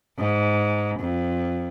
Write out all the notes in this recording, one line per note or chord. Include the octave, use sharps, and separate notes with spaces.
G#2
F2